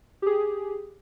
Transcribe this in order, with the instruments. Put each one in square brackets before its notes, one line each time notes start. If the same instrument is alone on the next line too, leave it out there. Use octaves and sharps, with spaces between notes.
[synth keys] G4 G#4